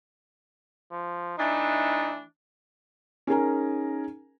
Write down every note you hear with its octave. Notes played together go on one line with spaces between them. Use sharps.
F3
E3 A3 D4 D#4
C#4 D#4 G#4 A#4 G#5 A#5